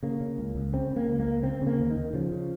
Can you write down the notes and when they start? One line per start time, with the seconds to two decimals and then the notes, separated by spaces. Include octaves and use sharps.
0.03 C#3 A#3
0.21 C#3
0.38 C#2
0.55 C#2
0.73 C#3 C4
0.91 C#3
0.96 A#3
1.08 C#2
1.20 A#3
1.27 C#2
1.43 C#3 C4
1.61 C#3
1.67 A#3
1.80 D#2
1.91 D#3
1.97 D#2
2.14 C#3 F3
2.32 C#3